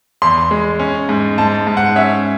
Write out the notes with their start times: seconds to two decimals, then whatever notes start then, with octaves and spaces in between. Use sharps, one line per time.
0.22 E2 C6
0.51 G#3
0.79 C#4
1.09 G#2
1.38 G#2 A5
1.67 G#2
1.77 F#5
1.96 C#4 E5